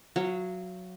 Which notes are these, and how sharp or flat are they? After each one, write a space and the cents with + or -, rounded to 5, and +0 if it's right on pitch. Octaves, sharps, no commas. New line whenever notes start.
F#3 -10 F5 -35